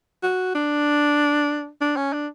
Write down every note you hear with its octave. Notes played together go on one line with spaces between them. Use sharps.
F#4
D4
D4
C#4
D4